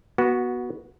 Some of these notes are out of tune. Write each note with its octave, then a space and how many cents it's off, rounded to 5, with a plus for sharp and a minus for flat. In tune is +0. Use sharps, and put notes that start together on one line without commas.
B3 -15 F#4 +5